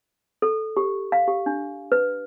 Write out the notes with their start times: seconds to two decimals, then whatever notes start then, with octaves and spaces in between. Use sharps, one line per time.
0.42 A4
0.77 G4
1.12 F5
1.28 G4
1.46 D4
1.92 B4